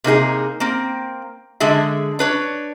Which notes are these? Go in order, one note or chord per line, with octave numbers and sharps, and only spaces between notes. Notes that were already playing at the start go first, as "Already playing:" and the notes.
C3 A#3 D#4 G#4
A#3 C4
D3 G#3 G#4 E5
D4 B4 C#5